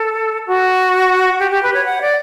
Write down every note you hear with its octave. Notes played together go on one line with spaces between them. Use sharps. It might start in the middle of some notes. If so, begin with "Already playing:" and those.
Already playing: A4
F#4
G4
G4
B4
C#5
F#5
D5